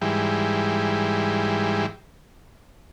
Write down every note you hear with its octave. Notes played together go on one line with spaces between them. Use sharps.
G#2 E3 G3